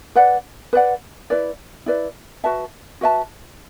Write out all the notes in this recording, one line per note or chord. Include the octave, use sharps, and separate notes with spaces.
B4 D5 F#5
B4 D5 F#5
E4 B4 D5
E4 B4 D5
F#4 B4 E5 A5
F#4 B4 E5 A5